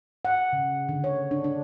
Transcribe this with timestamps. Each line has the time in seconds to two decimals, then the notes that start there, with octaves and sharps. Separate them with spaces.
0.25 F#5
0.53 C#3
0.89 D3
1.04 C#5
1.31 D4
1.44 D4